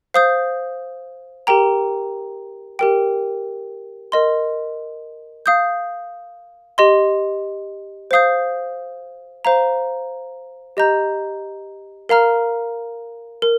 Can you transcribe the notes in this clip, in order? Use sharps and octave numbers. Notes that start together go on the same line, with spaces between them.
C5 F5 D#6 G6
G4 A#4 G5 A#5
G4 A#4 G5
A#4 D#5 C6
F5 D#6 G6
G4 D#5 C6
C5 F5 D#6 G6
C5 F5 A#5
G4 D#5 A#5 G6
A#4 F5 A#5 F6
A#4